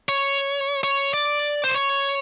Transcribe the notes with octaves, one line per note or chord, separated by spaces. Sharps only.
C#5
C#5
D5
C5
C#5